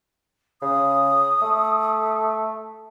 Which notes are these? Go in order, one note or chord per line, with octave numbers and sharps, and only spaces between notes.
C#3 D#6
A3